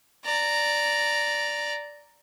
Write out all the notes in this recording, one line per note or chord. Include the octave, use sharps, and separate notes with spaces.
D5 A#5